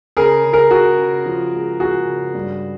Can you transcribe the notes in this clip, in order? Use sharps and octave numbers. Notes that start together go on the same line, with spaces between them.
C#3 G#4 A#4
C#3
G#4 A#4
C#3 F#4 G#4
C#3
F3
G#3
G#3 F#4 G#4
C#3
G2